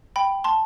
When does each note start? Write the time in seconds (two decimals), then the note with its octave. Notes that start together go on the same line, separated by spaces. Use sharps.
0.16 G5 B5
0.44 A5 C6